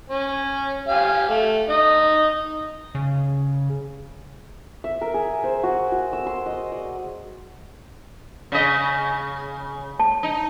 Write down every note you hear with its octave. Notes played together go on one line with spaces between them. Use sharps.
C#4
G4 F5 G#5
A3
D#4 D#5
C#3
E5
A#4
G#4
C5
F#4
F#4
E6
C6
D#5
D5
C#3 D#5
A5
D#4